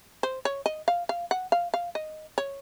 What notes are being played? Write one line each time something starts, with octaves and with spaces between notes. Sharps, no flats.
C5
C#5
D#5
F5
F5
F#5
F5
F5
D#5
C#5